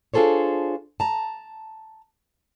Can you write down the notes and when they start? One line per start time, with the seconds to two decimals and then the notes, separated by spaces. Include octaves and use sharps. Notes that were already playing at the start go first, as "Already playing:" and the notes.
0.14 D4 F4 G#4 A4 C5 C#5
1.00 A5 A#5